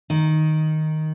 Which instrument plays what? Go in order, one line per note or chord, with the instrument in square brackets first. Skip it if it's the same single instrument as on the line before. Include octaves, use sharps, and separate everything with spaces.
[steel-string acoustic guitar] D#3